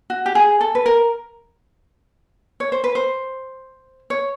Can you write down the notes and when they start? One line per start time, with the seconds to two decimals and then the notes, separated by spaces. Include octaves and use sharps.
0.10 F#4
0.26 G4
0.35 G#4
0.61 A4
0.75 B4
0.86 A#4
2.60 C#5
2.72 C5
2.84 B4
2.95 C5
4.10 C#5